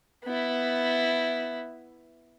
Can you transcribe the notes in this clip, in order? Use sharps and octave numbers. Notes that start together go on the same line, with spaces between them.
B3 E4